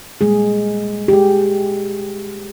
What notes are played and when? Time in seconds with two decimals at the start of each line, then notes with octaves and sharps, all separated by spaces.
0.21 A#2 G3 G#3 A#3 G#4
1.08 G4
1.13 G#3 G#4